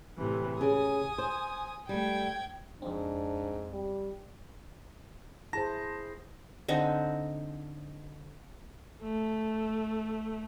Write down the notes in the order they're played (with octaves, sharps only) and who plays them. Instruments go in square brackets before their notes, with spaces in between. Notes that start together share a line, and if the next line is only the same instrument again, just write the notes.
[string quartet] A2 C3 E3
[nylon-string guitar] C#3 G#4 [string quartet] G#5 D#6
[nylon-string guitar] C5
[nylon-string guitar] G3 A3 [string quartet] G5 G#6
[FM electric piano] F2 C4 [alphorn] G#2 [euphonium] D4
[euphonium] G3
[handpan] E4 G#4 C5 [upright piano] A5 [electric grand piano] A#6
[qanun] D3 C4 D#4
[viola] A3